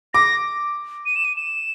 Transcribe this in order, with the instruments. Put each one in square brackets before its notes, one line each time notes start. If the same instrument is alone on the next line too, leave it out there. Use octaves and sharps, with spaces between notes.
[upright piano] D6 [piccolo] A#6
[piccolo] D#7
E7
D#7
E7